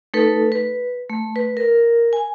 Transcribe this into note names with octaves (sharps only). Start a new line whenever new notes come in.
A3 D#4 A4 B4
B4
A3
B4
A#4
G#5